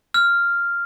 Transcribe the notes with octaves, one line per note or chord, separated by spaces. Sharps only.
F6